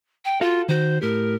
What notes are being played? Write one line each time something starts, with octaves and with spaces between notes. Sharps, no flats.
G5
F4 F#4 A4 F5
D#3 F#4 C5
A2 G4 A#4